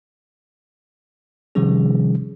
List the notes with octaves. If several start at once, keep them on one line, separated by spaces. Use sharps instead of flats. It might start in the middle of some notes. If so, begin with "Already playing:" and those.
C3 D#3 F3 G3 C#4 G#4